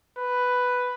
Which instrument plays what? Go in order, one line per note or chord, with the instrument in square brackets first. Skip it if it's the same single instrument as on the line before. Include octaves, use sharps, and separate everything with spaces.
[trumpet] B4